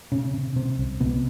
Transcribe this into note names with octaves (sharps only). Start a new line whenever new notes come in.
C3 C#4
C3
C3 C4
C2
C3 B3